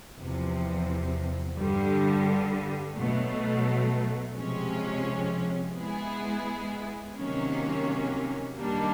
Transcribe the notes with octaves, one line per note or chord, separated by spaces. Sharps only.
E2 C3 F3
G2 D3 G3
B2 F#3 A3
C3 F3 G#3 C#4
G#3 B3 E4 G#4
C3 D#3 F#3 A#3 C#4
F#2 D#3 G3 A#3 D4